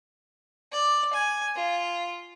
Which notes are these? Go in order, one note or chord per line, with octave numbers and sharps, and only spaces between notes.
D5
G#5
F4